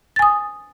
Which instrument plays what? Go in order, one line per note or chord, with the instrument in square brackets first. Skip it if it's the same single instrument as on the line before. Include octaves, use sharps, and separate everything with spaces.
[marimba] A6
G#5
D#6